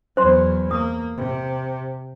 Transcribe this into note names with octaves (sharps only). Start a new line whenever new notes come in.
E2 F#3 C5 C6
A#3 D#6
C3